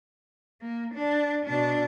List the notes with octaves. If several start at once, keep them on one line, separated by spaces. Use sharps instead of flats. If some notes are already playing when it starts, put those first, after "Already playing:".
A#3
D4
B2 D4